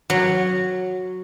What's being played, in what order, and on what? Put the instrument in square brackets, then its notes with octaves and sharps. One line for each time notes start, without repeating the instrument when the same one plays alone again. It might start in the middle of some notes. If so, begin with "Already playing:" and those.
[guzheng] F#3